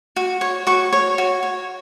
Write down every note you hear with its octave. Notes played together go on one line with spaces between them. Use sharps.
F#4
C#5
F#4 C#6
C#5
F#4
C#5